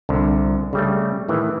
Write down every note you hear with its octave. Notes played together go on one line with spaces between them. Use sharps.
C2 D3
C#3 G3 A3
A2 D#3 E3